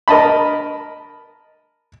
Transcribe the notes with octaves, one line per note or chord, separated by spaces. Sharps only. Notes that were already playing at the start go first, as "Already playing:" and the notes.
A#4 D#5 A5 B5